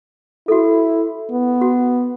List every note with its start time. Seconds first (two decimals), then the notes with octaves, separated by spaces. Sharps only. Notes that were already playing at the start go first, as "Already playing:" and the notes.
0.48 E4 F#4 A4
1.31 B3
1.61 F#4